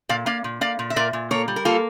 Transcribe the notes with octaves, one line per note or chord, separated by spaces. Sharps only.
A#2 D5 F5
A#3 D5 F5
A#2
A#3 D5 F5
A#2
E5
A#2 A#4 D5
A#2
A#3 A4 C#5
G3
A#4
A#3 F4 A4